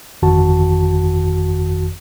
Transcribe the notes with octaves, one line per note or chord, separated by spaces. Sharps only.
G1 F2 D#3 F#4 A5